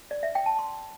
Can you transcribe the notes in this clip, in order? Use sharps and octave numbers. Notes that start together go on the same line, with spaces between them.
D5
E5
G5
A5
C6